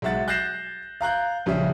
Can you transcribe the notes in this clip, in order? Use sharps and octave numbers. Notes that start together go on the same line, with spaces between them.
B1 G#3 E5 F#5 A6
F#6 G6 A6 A#6 C7 E7
F5 A#5 F#6 G6
A#1 C#3 G3 C#4 E5